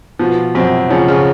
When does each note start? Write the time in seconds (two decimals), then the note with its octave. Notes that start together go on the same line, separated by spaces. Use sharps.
0.19 B2 F3 B3
0.55 F#2 C3 C4
0.90 C#3 F3 C#4
1.08 C#3 C#4